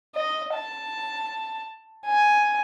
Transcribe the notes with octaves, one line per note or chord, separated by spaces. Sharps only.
D#5
A5
G#5